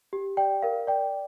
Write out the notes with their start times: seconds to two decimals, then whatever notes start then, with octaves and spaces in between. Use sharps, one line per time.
0.13 G4
0.37 D5 G5
0.62 A#4 F5
0.87 D5 G5